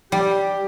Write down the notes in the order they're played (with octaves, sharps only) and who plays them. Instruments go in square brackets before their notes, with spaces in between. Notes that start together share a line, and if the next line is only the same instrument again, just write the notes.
[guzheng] G3 [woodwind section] G4